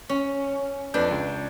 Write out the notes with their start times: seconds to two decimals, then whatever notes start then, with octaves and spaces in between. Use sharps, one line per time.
0.09 C#4
0.94 F2 D4 B4 G6
1.11 C#2